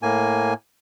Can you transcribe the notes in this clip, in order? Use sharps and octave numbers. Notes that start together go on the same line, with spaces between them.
A2 A#3 G#5